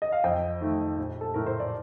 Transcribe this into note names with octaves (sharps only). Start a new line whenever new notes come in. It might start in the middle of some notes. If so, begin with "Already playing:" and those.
D#5
F5
F2 D#5 G5
D#3 A3
A#1
A4
A2 A3 A#4
C5
D5